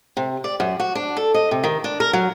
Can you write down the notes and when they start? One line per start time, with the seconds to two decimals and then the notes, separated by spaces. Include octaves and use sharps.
0.17 C3
0.44 D5
0.60 F#2
0.80 F#4
0.95 D4
1.17 A4
1.34 D#5
1.51 C3
1.64 D#3
1.84 D4
2.00 A#4
2.13 F#3